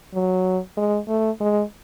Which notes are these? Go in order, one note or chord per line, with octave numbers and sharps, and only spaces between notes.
F#3
G#3
A3
G#3